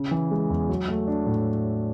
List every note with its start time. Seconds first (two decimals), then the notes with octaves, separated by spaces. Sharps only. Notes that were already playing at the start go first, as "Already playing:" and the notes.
Already playing: C#3
0.11 E3
0.31 G#3
0.50 E2
0.69 F#3
0.88 A3
1.08 D4
1.27 A2